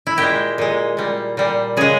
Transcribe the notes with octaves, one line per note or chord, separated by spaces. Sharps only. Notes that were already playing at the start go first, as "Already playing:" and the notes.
E4
A#2 G#3 G4
A#2 G#3
A#2 G3
A#2 G3
C#3 G#3 G#4